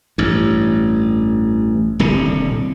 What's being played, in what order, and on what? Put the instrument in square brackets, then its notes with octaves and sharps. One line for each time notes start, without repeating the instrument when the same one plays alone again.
[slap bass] A1 G2
D#1 C2 D3